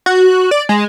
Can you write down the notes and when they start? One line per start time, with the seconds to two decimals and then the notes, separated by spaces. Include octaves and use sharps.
0.06 F#4
0.51 D5
0.69 G#3